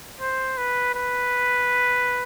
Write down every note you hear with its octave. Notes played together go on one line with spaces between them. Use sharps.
C5
B4
B4